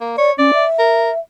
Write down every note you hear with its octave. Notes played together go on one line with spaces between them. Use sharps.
A#3
C#5 D5
C#4 D5
E5
A#4